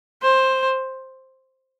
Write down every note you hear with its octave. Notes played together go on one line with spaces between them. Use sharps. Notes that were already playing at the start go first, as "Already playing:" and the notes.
C5